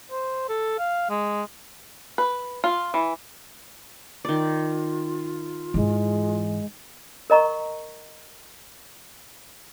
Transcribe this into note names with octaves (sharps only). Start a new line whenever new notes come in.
C5
A4
F5
G#3
B4
F4
E3
D#3 F4 D5
G#2 E3 G#3
A#4 D#5 A#5 C#6